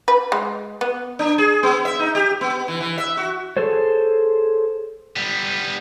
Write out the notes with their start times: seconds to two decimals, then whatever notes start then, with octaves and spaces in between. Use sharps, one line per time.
0.08 B4
0.32 G#3
0.81 B3
1.19 D4
1.38 G#4
1.63 B3
1.85 E5
1.99 D#4
2.15 G4
2.41 B3
2.68 E3
2.80 E3
2.98 E5
3.17 F#4
3.57 G#4 A4 C5 C#5
5.16 G3 B3